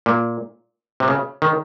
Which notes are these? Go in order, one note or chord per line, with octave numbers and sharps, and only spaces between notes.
A#2
C3
C#3
D#3